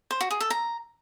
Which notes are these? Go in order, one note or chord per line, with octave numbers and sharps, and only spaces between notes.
C5
F#4
G#4
A4
A#5